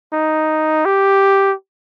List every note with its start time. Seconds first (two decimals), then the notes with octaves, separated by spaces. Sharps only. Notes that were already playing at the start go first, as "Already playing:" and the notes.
0.13 D#4
0.85 G4